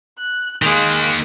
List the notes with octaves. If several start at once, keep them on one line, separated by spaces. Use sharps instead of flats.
F#6
D#3 G#3 A#3 F#6